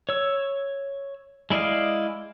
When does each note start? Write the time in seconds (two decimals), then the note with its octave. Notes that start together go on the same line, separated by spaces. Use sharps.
0.09 C#5 E6
1.50 G#3 E4 D5 D#5 F5